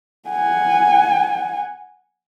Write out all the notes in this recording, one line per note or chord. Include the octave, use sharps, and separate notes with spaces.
F#5 G#5